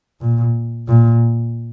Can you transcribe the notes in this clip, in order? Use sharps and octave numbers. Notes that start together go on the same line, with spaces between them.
A#2
A#2